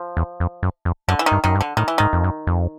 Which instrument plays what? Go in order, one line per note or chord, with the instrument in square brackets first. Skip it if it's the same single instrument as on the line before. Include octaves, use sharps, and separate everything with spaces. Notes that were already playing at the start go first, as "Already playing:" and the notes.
Already playing: [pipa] F3
[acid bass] E2
F2
F#2
F2
[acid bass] F#2 [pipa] D3
[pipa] E3
D#3
[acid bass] G2
[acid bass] F#2 [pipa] D#3
[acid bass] G2
[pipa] D3
[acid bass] A2 [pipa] D#3
[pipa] E3
[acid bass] G#2 [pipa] D#3
[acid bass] F2
F#2
F2